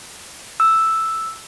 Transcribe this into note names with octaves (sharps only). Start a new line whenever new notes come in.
E6